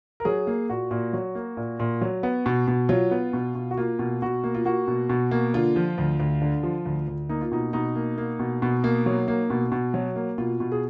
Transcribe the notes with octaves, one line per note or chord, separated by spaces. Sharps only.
A#4
F#3 G#4
A#3
A#2 F#4
A#2
F#3
A#3
A#2
A#2
F#3
B3
B2
B2
F#3 F4
B3
B2
B2
F#4
A#3 F4
B2
B2 F#4
A#3
F4
A#3 F#4
B2
B2
A#3
D3 F4
F3
D2
D2
D3
F3
D2
D2
A#3 D#4
F4
B2 D#4
B2 D#4
A#3
A#3
B2
B2
A#3
F#3
A#3
B2
B2
F#3
A#3
B2 F4
B2
G#4